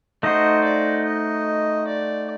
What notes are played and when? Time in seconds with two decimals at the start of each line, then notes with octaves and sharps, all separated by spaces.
0.23 A3 D#4 F#4 C5 D#5
0.64 D5
1.05 D#5
1.87 D5